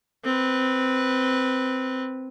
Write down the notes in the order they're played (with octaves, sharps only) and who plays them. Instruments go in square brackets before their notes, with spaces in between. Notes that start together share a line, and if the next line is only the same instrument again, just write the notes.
[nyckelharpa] C4 B4